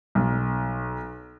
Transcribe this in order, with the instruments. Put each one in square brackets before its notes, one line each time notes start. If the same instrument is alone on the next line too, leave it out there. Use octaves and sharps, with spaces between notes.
[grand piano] B1